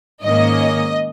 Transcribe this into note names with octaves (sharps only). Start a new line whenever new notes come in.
G#2 D#3 A#3 C#4 D#5